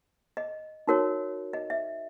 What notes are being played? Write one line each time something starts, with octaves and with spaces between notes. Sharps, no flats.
D#5
D#4 F#4 A#4 C#5
D#5
E5